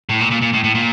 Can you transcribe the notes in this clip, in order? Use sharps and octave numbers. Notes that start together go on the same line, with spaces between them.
A2
A#2
A#2
A#2
A2
A2
A#2